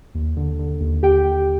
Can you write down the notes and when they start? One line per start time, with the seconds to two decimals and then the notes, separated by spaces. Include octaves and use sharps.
0.15 D#2
0.37 D3
0.59 D3
0.81 D#2
1.03 D#2 G4 G5
1.25 D#2